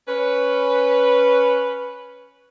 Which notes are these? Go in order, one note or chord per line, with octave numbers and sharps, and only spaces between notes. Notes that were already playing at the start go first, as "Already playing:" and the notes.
C#4 B4